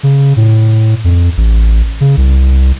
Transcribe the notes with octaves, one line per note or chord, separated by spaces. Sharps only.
C#3
A2
F2
A1
C#3
C2